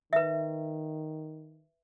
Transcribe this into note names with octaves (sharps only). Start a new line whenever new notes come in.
D#3 B4 E5